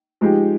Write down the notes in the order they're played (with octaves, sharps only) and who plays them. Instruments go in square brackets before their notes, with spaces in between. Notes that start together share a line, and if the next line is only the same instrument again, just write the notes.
[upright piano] F3 G#3 D#4 G4